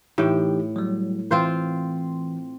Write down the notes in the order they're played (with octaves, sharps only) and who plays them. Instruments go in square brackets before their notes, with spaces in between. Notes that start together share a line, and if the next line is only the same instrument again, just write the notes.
[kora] A2 G5 [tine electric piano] E3 D#4 G4
[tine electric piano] F#3 G3
[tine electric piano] E3 [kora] C4 F4 C5